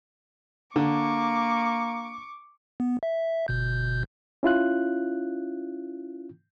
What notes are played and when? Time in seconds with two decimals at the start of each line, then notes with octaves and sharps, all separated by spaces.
0.76 D3 A#3 C#6 D6
2.80 B3
3.03 E5
3.48 G1 B2 G6
4.43 C#4 E4 F4 F#6